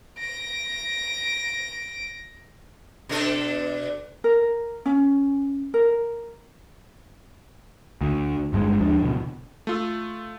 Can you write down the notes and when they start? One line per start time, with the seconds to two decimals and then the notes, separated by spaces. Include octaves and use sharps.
0.19 A#6 D7
3.09 B2 D4 A4
4.24 A#4
4.86 C#4
5.74 A#4
8.01 D2
8.53 G1 G2 D3 G#3
8.81 D#2 F3 D4
9.01 D1 A1 B2
9.67 A3 F4 E6